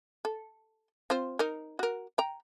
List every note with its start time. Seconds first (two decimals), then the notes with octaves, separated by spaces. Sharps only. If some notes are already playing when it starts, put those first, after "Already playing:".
0.25 A4
1.10 C4 F4 C5
1.39 D#4 A#4
1.79 F#4 A#4
2.18 G5 A#5